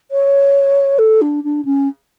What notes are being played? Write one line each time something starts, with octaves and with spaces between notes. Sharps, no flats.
C#5
A4
D4
D4
C#4